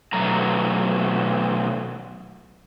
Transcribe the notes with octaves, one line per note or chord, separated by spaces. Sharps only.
B2 F#3 A3 A#5